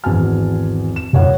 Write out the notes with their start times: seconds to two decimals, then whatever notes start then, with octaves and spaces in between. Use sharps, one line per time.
0.04 G#1 E2 F#4 G#5 A5 F6
0.96 E7
1.13 D#1 C#5 F#5